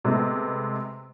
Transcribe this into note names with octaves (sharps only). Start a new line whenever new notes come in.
C3 G#3 A3 B3